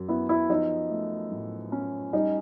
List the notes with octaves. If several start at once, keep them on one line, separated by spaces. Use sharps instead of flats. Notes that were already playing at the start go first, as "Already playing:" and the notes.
Already playing: F#2
B3 E4
E4
F3 D#4
A3
A2
C#4
G3 D#4